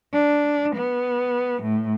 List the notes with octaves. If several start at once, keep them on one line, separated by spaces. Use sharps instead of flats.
D4
B3
A2